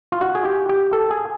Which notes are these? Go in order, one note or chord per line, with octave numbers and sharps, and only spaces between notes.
F4
F#4
G#4
G4
G4
A4
G#4